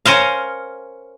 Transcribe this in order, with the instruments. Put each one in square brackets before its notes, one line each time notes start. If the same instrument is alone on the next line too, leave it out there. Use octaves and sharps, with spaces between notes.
[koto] C#4 A#4 C5 F5